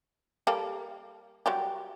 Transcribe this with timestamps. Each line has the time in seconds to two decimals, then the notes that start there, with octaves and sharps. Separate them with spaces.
0.47 G3 A#3 A4
1.46 F#3 G3 G4